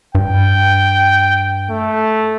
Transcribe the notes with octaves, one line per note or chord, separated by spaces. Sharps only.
G2 G5
A3